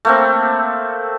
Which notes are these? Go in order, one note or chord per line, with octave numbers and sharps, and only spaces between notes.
A3 A#3 C4